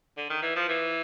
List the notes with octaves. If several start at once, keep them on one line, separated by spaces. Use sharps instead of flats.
D3
D#3
E3
F3
E3